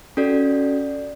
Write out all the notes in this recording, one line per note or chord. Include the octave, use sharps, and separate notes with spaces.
C#4 F#4 A4 D5